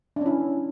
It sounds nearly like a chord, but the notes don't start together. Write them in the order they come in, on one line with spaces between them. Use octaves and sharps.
D4 C#4 E4